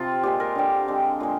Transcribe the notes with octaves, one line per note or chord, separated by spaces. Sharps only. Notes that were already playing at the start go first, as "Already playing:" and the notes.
Already playing: C3 F3 C4 F4
A#2 G#3 C4 G4
A#4
D3 G3 C4
D3 G#3 C4
A#2 G#3